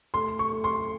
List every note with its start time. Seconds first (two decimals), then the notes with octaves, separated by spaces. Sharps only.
0.14 A3 C6
0.39 C#6
0.51 A3
0.64 C6